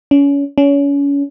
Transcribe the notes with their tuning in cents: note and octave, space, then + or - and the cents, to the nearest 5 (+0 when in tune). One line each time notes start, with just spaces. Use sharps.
C#4 +30
C#4 +30